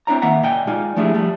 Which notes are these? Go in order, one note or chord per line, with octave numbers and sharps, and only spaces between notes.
C4 D4 E4 C#5 A#5
D#3 A#3 E5 F#5 A#5
A#2 D#5 G5 G#5
G#3 D#4 F4 D5 G#5
F3 A3 D4 E4 G4 G#4
F3 G3 A3